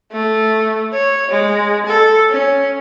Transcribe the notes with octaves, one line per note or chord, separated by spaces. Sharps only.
A3
C#5
G#3
A4
C#4